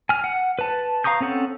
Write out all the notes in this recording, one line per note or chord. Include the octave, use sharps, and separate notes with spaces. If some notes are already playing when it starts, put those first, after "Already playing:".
G#5 F6
F#5
B4 A5
F5 A#5 C#6 D#6 G6
C4 C#4 A4 F#5